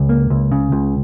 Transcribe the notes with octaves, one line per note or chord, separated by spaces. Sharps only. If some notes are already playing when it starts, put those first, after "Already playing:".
Already playing: C#2
A#3
C#2
C#3
C#2